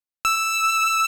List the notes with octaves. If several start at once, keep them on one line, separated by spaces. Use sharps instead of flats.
E6